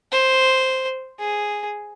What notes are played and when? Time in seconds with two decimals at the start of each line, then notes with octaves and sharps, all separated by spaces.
0.12 C5
1.19 G#4